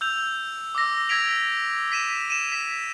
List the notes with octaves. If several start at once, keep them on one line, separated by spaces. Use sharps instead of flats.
E6 G6 F7
D6 E6 A#6
E6 G#6 A#6 B6 D7 F7
B6 D#7 E7
D#7 E7
B6 F7